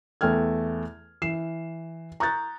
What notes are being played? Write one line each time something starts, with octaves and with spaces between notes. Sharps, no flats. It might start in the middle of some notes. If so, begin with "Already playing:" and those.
E2 A3 G5 F6 G#6
E3 C7 E7
A#5 C#6 D#6 F#6 G6 A6